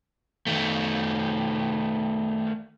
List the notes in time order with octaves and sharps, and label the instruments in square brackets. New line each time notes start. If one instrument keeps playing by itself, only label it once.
[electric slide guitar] D#3 A3